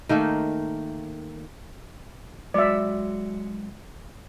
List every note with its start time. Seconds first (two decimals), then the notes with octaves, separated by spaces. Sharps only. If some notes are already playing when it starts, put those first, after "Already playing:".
0.09 D#3 A3 A#3 D#4
2.54 F#3 G#3 F#4 D5 E5